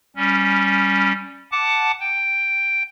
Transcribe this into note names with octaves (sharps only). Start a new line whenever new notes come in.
G3 C#4
F#5 A5 D6
G5